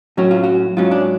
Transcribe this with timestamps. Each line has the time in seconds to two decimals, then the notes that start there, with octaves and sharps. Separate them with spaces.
0.17 A2 F#3 C#4 F#4
0.31 F4
0.44 F#4
0.77 G#2 F#3 C#4 F4
0.91 D4